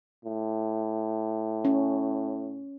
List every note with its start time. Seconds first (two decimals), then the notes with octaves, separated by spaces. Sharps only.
0.25 A2
1.65 C#4